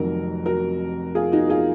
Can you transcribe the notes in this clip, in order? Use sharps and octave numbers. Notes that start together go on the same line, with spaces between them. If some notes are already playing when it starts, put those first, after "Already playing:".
Already playing: F1 F2 D#3 F#3 F#4 A#4
F#4 A#4
F4 G#4
D#4 F#4
F4 G#4